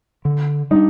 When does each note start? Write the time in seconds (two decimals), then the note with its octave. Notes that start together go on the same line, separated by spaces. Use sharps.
0.25 D3
0.71 G3 D4 D#4